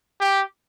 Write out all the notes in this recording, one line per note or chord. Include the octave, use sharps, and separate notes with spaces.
G4